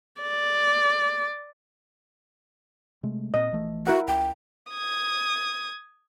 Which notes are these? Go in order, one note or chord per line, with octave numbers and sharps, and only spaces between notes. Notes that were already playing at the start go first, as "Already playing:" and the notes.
D5
C3 G#3 A3
A#2 C4 D#5
A#1 E3 A3
E4 F#4 A#4 F#5
C#2 G5
D#6 G#6